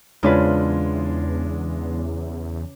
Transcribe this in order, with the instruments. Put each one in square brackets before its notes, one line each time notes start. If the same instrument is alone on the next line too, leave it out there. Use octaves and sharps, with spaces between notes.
[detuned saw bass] E2 [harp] C#3 B4 [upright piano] G#3 D4 F4